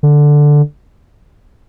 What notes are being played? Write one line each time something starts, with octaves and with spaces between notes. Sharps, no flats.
D3